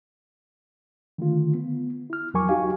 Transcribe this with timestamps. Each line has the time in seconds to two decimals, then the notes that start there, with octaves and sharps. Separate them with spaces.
1.18 D3 D#3 A3 F4
1.54 B3
2.10 E4 F6
2.34 E2 F#3 A#4 G#5 C#6 D6
2.49 D#4 F#4 G4 F5 G#5